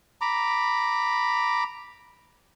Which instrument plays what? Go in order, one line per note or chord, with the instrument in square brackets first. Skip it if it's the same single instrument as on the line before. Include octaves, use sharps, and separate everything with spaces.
[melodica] A#5 B5 D6